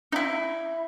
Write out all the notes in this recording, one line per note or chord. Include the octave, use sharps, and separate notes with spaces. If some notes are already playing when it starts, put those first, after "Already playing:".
D#4 E4